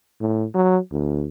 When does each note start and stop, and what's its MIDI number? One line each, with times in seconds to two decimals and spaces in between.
0.21 0.45 45
0.55 0.78 54
0.92 1.28 38